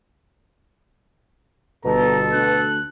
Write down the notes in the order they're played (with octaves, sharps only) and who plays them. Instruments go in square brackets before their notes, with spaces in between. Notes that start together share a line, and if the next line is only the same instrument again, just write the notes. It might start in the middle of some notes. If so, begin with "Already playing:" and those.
[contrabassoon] G1 [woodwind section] B2 [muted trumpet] A4 [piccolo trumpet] A#5
[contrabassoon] D2 [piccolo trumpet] F#6